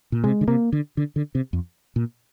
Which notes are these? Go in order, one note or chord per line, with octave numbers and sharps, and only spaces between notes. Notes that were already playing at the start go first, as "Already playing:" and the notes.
A#2
C3 G#3
D3
C3 A#3
D3
D3
D3
C3
F2
A#2